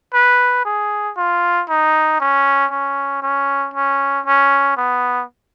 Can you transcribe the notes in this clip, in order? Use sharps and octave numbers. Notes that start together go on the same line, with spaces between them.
B4
G#4
F4
D#4
C#4
C#4
C#4
C#4
C#4
B3